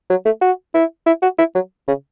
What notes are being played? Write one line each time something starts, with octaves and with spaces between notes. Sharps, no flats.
F#3
A3
F#4
E4
E4
F#4
E4
F#3
C#3